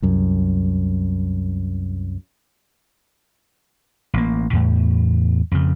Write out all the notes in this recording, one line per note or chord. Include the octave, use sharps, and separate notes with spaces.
C2 F#2
A1 A#3
E2 A2
F2 C#3